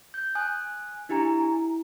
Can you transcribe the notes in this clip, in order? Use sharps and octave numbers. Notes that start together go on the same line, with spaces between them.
G6
G#5 D#6 F#6
D4 E4 G4 G#5 A#5
E4